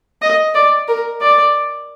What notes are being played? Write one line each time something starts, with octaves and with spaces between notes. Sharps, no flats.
D#5
D5
A#4
D5